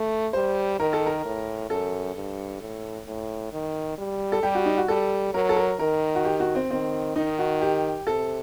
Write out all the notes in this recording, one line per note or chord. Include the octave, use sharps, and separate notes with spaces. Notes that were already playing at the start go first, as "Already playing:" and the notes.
Already playing: A3
G3 C5
D#3 A#4
A4
A#4
A2
F#2 A4
G2
A2
A2
D#3
G3
A4
G3 G4
F#4
D#4
F#4
G3 A4
F#3 A#4
A4
A#4
D#3 A#4
F#4
G4
F#4
C4
D#3 C4
D#3 D#4
F#4
G4
C3 A4